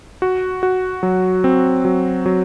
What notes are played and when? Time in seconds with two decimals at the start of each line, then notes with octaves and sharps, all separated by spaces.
0.22 F#4
0.63 F#4
1.03 F#3
1.44 C4
1.85 F#3
2.26 F#3